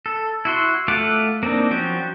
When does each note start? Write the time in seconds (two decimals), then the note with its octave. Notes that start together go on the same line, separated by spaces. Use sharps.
0.06 A4
0.45 E4 F#4 C6
0.88 A3 F4 A4 F#5 D6
1.43 A#3 C4 D4 D#4
1.71 F3 F#3 C#4 F#4 G5